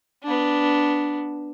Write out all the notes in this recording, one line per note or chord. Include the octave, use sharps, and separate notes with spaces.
B3 D4